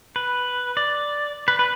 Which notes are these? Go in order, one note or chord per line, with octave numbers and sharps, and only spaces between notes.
B4
D5
B4
B4